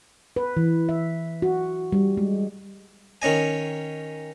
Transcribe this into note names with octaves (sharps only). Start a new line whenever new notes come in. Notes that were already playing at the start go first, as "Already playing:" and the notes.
B4
E3
E5
F#4
G3
G#3
D#3 C#4 D#5 G#5